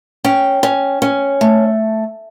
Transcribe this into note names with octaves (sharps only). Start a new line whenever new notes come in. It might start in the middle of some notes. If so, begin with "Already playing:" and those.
C#4 G5
C#4
C#4
A3